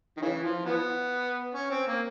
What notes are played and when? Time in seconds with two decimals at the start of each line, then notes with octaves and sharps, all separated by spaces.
0.17 D#3
0.22 C#3 E3
0.44 F3
0.65 E3 B3
1.54 C#4
1.71 C4
1.87 A#3